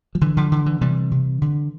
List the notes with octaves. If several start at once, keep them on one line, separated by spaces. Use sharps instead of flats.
F3
D3 E3
D3 F3
D3 E3
E3
C3 E3 G3
C3
D3